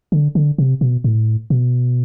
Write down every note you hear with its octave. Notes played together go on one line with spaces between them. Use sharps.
D3
D3
C3
B2
A2
B2